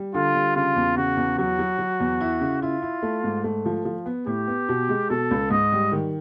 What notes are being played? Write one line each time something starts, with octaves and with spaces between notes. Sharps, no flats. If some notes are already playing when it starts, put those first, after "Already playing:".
Already playing: G3
D3 F4
G3
C#3 F4
E2
C#3 F#4
E2
F#3 F#4
F#3
F#3
E2
E4
C#3
E4 F4
E4
A3
G#2
A3
F3
F3
B3
A2 G4
B3
B2
G#3
B2 A4
C#2
G#2 D#5
G3
D#3